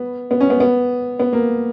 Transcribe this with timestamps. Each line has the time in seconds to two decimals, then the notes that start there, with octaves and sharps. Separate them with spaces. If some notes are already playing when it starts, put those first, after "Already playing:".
Already playing: B3
0.31 B3
0.40 C#4
0.50 B3
0.60 B3
1.19 B3
1.33 A#3